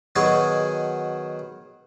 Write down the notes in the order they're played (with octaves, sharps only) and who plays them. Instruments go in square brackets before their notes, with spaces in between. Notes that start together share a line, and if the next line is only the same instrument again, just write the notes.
[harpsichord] B2 D#3 F#3 G#4 G#5 C#6